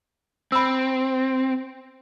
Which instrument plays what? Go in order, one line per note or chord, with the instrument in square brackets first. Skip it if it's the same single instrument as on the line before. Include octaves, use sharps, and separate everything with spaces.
[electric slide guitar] C4 [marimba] B5 E6